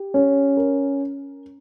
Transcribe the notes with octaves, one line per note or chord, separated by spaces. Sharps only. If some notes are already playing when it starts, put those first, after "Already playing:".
Already playing: G4
C#4
A#4